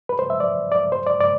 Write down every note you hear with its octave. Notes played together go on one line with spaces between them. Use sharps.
B4
C5
E5
D5
D5
C5
D5
D5